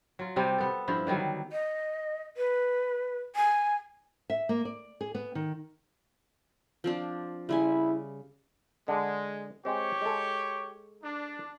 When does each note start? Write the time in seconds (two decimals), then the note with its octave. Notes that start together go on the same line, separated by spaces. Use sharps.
0.19 F#3 F4
0.36 C3 G3 C4
0.58 B3 A4
0.88 G2 F3 E4
1.07 D3 D#3 F#3 G3
1.52 D#5
2.37 B4
3.36 G#5
4.30 E5
4.49 A#3
4.65 D5
5.01 G#4
5.15 B3
5.35 D#3
6.84 F3 C4 D4
7.49 C#3 G3 E4 G#5
8.88 D3 G#3
9.65 G#3 C4 G4 C#5 C#6
10.01 G#3 A4
11.03 D4